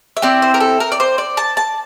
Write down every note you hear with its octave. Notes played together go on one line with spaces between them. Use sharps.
E5
C4 E4 G4 D5
C5
A#4
A4
A#4
D5
C5
D5
A5
A5